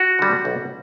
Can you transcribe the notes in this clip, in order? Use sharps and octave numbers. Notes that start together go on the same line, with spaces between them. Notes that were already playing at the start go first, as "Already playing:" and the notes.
Already playing: F#4
D3 G3
B1